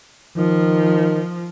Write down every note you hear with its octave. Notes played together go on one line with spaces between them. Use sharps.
D#3 F3